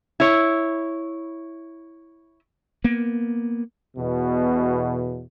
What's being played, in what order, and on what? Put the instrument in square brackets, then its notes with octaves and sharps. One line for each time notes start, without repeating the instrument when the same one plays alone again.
[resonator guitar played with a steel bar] E4 C#5
[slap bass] A#3 B3
[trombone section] E2 B2